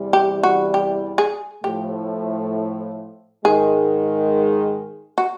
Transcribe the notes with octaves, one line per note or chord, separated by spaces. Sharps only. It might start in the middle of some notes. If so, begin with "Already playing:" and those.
Already playing: E2 C3 E3 G3
G4
F#4
G4
G#4
A2 F3 A3 G4
G#2 D#3 G#3 G#4
F#4